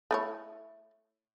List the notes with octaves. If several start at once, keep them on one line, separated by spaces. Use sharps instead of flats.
A3 E4 C#5